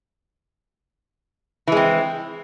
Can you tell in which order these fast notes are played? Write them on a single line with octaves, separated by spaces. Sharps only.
E3 G#3 C4